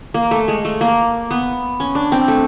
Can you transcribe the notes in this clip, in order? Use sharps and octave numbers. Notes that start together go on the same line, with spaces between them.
A#3
A3
G#3
A3
A#3
B3
C#4
D4
C4
A3